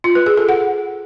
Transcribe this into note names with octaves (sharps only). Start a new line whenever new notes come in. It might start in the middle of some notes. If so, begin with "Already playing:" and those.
F4
B4
G#4
A4
F#5